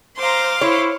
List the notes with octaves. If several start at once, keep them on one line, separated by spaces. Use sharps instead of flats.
C5 F5 A#5 C6 D6
E4 C5 C#5